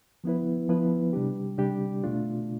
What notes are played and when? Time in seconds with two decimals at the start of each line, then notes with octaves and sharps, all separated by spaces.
0.24 F3 B3 E4 B4
0.69 F3 B3 E4 B4
1.13 C3 G3 D4 G4
1.58 C3 G3 D4 G4
2.04 B2 A3 D4 F4